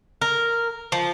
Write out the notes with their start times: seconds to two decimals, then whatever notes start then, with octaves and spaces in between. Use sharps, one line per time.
0.21 A#4
0.92 F3